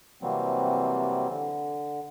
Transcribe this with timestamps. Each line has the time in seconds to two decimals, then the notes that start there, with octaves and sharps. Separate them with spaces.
0.22 C3 E3 F#3 G3 A#3 C4
1.30 D3